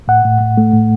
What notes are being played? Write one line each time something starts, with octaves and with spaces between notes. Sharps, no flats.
A2 F#5
A2
A2
A3
A2